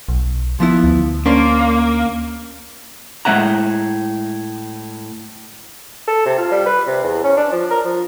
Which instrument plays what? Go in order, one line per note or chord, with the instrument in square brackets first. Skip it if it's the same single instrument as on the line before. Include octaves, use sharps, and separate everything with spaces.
[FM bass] B1
[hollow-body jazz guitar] F3 B3 E4
[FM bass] D2
[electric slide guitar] A#3 [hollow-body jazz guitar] C#4 D4 C5
[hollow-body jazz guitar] A2 G#3 C#4 E5 F#5 A#5
[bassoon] A4
C3
F4
G3
B4
C3
E2
C#4
D4
F3
A#4
F3